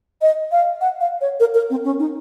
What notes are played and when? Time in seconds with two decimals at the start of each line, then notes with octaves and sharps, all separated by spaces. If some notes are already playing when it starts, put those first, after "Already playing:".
0.22 D#5
0.52 F5
0.81 F#5
1.01 F5
1.21 C#5
1.40 A#4
1.55 A#4
1.70 C4
1.84 C#4
1.99 D#4